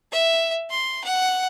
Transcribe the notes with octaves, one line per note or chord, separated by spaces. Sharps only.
E5
C6
F#5